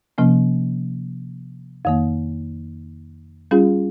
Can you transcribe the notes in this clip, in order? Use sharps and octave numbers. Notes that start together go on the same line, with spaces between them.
C3 F3 A#3 C#4
F2 D#3 A#3
G3 C#4 F4 G#4